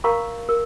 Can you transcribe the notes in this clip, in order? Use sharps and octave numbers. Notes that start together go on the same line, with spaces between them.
A#4 F5 A#5 C#6
A#4